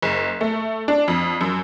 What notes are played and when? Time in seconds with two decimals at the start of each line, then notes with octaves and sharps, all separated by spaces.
0.02 F#1
0.41 A3
0.88 D4
1.08 F2
1.41 F#2